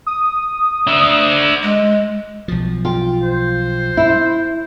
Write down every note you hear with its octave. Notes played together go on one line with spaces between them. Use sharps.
D#6
D4 E5
G#3
B1 F3
F4 G5
C5
E4